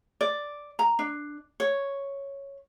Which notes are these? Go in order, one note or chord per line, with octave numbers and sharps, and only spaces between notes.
D5
A#5
D4
C#5